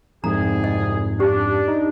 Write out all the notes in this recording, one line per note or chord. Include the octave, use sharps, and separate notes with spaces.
C2 F2 G#2 C3 G#4 A#5
D#5
C#4 D4 G4
D#4